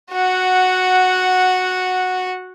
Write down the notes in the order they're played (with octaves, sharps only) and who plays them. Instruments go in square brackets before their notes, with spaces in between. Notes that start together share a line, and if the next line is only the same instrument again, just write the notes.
[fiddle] F#4 F#5